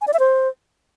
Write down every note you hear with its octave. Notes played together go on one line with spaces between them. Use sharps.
G#5
D5
E5
C5